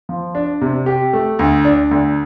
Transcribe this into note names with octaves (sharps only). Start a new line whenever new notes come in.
F3
D4
C3
G4
A3
D2
D4
D2